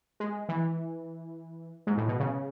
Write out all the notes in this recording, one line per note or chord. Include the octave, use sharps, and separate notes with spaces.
G#3
E3
G#2
A2
B2
C#3